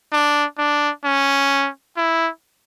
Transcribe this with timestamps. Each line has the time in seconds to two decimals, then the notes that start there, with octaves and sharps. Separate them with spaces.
0.13 D4
0.59 D4
1.04 C#4
1.97 E4